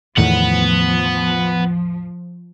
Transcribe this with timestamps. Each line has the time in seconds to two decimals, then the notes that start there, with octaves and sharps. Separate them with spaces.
0.17 E2 A2 D#3 F3 B3 F#5